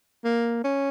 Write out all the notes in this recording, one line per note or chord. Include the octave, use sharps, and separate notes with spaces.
A#3
C#4